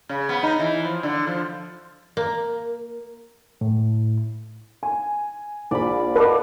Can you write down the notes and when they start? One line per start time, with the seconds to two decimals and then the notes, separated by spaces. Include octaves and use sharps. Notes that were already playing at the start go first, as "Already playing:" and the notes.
0.09 C#3
0.29 B3
0.43 D#4
0.59 E3
0.84 F3
1.03 D3
1.27 F3
2.17 A#3
3.61 A2
4.83 G#5
5.71 A#1 D5 B5
6.15 F#4 A4 B4 D#5 F5 D6